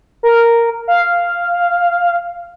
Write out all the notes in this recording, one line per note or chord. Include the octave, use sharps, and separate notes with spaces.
A#4
F5